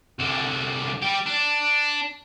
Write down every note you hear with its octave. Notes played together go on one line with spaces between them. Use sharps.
C2 D3
G3 G4
D4